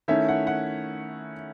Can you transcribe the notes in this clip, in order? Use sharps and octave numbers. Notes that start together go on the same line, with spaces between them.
D#3 A3 C#4 E4 E5
F#5
F#5